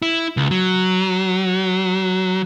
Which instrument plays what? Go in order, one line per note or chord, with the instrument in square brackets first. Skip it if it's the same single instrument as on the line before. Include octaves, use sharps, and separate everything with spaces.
[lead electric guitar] E4
C#2
F#3